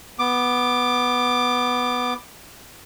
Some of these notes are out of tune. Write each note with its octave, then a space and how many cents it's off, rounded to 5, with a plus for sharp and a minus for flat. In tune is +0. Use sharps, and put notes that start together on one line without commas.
B3 +0 D6 +15